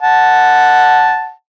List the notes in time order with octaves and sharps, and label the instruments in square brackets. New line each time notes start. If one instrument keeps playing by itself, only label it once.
[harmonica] F#5 A5